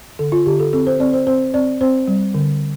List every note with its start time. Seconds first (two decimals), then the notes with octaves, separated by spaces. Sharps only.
0.19 D3 A4
0.32 F4
0.46 D3 G4
0.60 A4
0.73 C4 A4
0.87 C5
1.00 C4 D5
1.13 C5
1.27 C4 C5
1.54 C4 D5
1.81 C4 C5
2.07 G3
2.34 D3